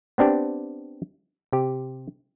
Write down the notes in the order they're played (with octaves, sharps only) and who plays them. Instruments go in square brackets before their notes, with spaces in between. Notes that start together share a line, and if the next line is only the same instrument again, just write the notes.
[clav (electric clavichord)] B3 C4 D4 G4
C3 G4